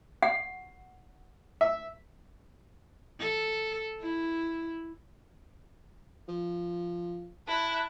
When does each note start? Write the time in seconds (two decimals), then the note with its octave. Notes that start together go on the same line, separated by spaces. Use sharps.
0.23 F#5
1.61 E5
3.20 A4
4.00 E4
6.28 F3
7.48 E4 A5 F#6